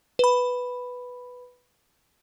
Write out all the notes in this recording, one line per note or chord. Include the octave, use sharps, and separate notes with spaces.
B4 B5